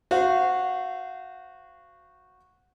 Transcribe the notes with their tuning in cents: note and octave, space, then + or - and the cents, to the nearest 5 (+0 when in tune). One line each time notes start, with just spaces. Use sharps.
F#4 -10 C5 -20 F5 -30